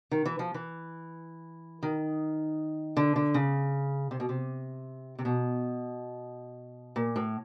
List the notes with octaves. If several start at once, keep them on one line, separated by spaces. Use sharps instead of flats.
D#3
E3
F3
E3
D#3
D3
D3
C#3
C3
B2
C3
C3
B2
A#2
A2